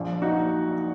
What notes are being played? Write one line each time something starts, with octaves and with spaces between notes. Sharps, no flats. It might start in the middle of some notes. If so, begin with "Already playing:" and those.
Already playing: A#1 A#2 F3
D#4 F#4